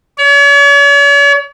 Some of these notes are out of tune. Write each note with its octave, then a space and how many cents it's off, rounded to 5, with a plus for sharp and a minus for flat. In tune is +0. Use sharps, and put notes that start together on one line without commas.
C#5 +45